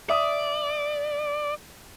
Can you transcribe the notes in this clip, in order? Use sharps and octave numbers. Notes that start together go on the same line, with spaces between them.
D5 E5 D#6